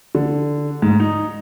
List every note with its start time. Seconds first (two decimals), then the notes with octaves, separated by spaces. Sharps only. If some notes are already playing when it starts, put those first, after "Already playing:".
0.15 D3
0.82 G#2
1.00 D#4